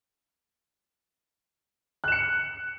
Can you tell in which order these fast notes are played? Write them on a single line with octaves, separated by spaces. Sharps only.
F#6 E7 C#7